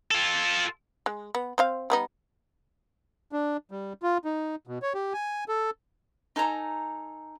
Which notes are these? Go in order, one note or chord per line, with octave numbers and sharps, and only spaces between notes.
F4 A4
G#3
B3
C4 C5 F5
G3 B3 D#4
D4
G3
F4
D#4
B2
C#5
G4
G#5
A4
D#4 A4 G#5 A#5